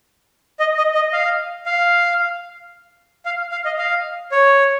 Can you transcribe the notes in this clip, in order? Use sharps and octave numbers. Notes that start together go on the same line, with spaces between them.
D#5
D#5
D#5
F5
F5
F5
F5
D#5
F5
C#5